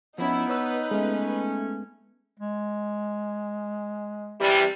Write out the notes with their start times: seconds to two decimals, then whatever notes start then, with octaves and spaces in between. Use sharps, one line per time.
0.18 F3 B3 C#4 D#4 E4
0.50 B4 C#5 E6
0.91 G#3 A3 B3 C#4
2.40 G#3
4.39 C3 E3 G3